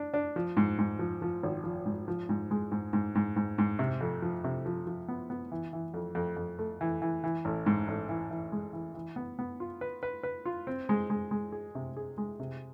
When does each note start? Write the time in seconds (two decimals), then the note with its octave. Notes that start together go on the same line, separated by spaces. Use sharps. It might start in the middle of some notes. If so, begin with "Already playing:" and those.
Already playing: D4
0.14 D4
0.36 F3
0.57 G#2
0.79 G#2
0.99 F3
1.22 F3
1.43 G#1
1.64 F3
1.86 G#2
2.08 F3
2.29 G#2
2.51 G#3
2.71 G#2
2.93 G#2
3.15 G#2
3.36 G#2
3.58 G#2
3.79 C3
4.01 F2
4.22 F3
4.44 C3
4.66 F3
4.87 F3
5.08 B3
5.30 B3
5.52 E3
5.73 E3
5.94 F2
6.15 F2
6.37 F2
6.59 A3
6.81 E3
7.02 E3
7.24 E3
7.45 A1
7.66 G#2
7.88 A1
8.09 E3
8.31 E3
8.52 G#3
8.73 E3
8.95 E3
9.16 B3
9.39 B3
9.60 F4
9.81 B4
10.03 B4
10.23 B4
10.45 F4
10.67 C4
10.89 G#3
11.10 G#3
11.31 G#3
11.52 G#4
11.75 C3
11.97 G#4
12.18 G#3
12.40 C3